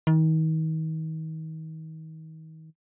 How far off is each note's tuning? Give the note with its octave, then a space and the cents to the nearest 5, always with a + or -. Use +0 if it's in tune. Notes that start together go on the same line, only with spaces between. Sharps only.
D#3 +35